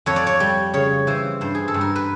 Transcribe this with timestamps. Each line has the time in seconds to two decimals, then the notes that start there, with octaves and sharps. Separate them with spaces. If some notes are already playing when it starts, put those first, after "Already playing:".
0.06 F2 C#5
0.16 D5
0.27 C#5
0.40 G3
0.74 C#3 C#5
1.07 E3 C5
1.41 G2 C5
1.55 G#4
1.68 A4
1.74 G2
1.81 A#4
1.96 B4